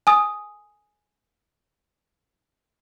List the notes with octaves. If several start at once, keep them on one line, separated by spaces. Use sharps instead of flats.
G#5 D#6